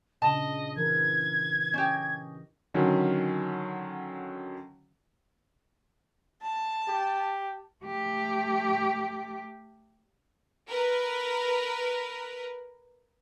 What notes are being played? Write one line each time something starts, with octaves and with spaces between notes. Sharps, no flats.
A#2 C#3 D4 D#5 A5
E3 A#4 G#6
C#4 G4 D#5
D3 D#3 F#3 C#4
A5
G4
A3 G4
A#4 B4